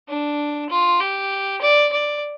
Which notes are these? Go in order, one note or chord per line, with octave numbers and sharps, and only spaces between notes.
D4
F4
G4
D5
D5